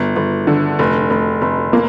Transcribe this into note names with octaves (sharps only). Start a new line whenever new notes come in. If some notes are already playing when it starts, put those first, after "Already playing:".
Already playing: G1
G1
D3
F1
F1
F1
A#3